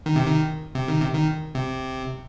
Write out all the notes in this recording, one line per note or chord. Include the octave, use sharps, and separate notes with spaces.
D#3
C3
D#3
C3
D#3
C3
D#3
C3